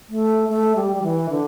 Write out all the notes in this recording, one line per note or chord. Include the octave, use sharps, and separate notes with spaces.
A3
A3
G3
G3
E3
D3